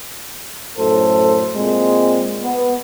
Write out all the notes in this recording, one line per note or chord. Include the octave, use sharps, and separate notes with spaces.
F#2 A2 A4 C5
A#2 G#3 C4
B3